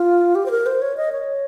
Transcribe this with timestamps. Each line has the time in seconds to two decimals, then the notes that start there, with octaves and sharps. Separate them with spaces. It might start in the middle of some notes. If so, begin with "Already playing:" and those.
Already playing: F4
0.35 G4
0.46 C5
0.51 A#4
0.66 C5
0.82 C#5
0.97 D#5
1.12 C#5